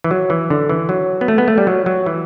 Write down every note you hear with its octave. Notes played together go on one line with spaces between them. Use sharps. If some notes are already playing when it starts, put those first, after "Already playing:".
E3
F#3
E3
D3
E3
F#3
B3
A3
B3
A3
G3
F#3
F#3
E3